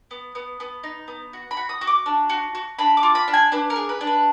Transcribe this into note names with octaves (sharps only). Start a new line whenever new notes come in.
B3
B3
B3
D#4
B3
F#4
B5
F#4
D#6
F#4
D6
D4
F#4
F#4
D4 B5
D6
F4
B5
D4
G#5
D4 B4
A#4
G#4
B4
D4
B4